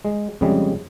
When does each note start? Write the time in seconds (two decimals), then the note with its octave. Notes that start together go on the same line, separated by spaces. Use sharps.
0.05 G#3
0.41 F2 C#3 G3 G#3